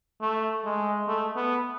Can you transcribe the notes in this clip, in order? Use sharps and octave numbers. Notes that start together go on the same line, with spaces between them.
A3
G#3
A3
B3